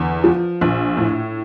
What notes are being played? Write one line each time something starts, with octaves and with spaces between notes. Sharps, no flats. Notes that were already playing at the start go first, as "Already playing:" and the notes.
Already playing: E2 D3
F3
A#1
A2